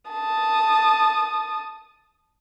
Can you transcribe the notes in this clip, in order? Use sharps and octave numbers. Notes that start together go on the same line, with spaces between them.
A5 D#6